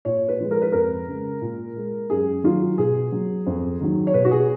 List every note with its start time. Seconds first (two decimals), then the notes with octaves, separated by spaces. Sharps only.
0.05 A#2 C#5
0.28 B4
0.40 F3 G#3
0.51 A#4
0.62 B4
0.72 F2 A#4
1.07 C#3 G#3
1.41 A#2
1.76 G#3
2.10 F#2 G#4
2.44 D#3 F#3 F4
2.78 B2 G#4
3.12 F#3
3.47 F2
3.80 D#3 F#3
4.07 C#5
4.14 B2 B4
4.25 F#4
4.31 G#4